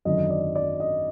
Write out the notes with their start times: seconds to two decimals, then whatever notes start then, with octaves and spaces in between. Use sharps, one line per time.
0.05 G#1 F#2 D3 F#3 D#5
0.30 D5
0.55 D5
0.80 D#5